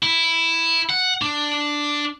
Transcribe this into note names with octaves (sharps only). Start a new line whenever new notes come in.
E4
F#5
D4